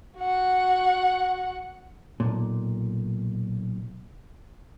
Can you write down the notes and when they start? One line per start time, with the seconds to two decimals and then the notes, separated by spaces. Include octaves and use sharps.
0.18 F#4 F#5
2.20 B1 E2 A#2